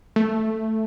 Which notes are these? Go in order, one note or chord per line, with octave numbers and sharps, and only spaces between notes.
A3